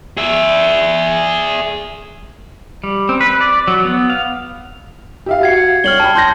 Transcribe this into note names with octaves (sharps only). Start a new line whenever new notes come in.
G#4 E5
G3
C4
B4
D5
F#3
B3
F5
G4 E5 F5
F#4 G#6 C7 C#7
G3 C#5 F6 F#7 G7
G5 A5 B5
C6 G6 A#6